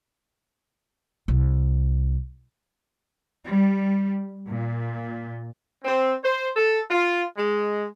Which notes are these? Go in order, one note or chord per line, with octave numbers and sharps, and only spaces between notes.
C2
G3
A#2
C4
C5
A4
F4
G#3